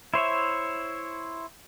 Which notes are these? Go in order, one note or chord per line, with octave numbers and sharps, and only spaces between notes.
E4 C5 C#5 E5